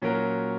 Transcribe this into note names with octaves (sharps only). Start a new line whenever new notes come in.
A#2 F#3 C#4 F#4 A#4